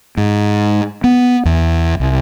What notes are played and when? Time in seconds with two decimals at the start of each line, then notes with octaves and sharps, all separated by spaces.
0.17 G#2
1.04 B3
1.45 E2
2.00 C2